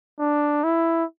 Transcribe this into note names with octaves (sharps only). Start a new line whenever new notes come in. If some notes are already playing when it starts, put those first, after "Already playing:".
D4
E4